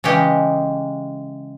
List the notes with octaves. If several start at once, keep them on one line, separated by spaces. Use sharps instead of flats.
C#3 E3 G#3 G4